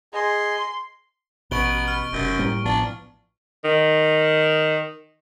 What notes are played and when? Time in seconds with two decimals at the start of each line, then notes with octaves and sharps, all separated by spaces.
0.14 G#4 D#5 C6
1.51 A1 B2 B3 C#6 D7 G7
1.88 F6
2.13 F1 F#2
2.39 A2 G3 A#3
2.65 A1 F3 B3 D4
3.65 D#3